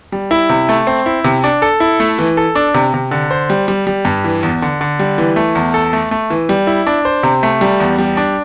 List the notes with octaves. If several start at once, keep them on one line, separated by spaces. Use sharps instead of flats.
G3
E4
C3
A3
C4
E4
C3
D4
A4
E4
A3
E3
A4
D4
C3
C3
D3
C5
G3
G3
G3
G2
E3
E2
D3
D3
G3
E3
A3
E2
A4
A3
A3
E3
G3
E4
D4
C5
C3
A3
G3
E2
G3
D4